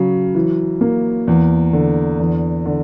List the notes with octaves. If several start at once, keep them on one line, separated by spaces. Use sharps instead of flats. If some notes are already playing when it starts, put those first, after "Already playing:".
Already playing: C#3 F#3
E3
A#3
E2
D3
E2
D3